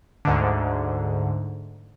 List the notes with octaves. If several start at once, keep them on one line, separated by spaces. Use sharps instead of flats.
D2 G#2 D3